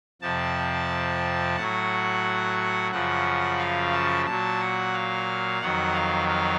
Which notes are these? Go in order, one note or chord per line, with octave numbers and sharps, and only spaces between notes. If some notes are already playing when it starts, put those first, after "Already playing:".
F2 C3 F3 A5
A2 F#3 F#5
F#2 C#3 F3 F#5
F5
A5
A#2 F#3 A5
F#5
F5
F2 D#3 F#3 F#5
F5
F5